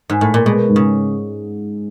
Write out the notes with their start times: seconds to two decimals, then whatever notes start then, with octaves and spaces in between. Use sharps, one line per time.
0.10 G#2
0.21 A2
0.34 A#2
0.45 B2 G#3
0.68 G#2
0.76 C#3